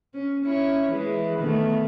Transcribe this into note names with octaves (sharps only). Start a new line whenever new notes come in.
C#4
C#4 E4 C#5
E3 G#3
D#3 A3 B3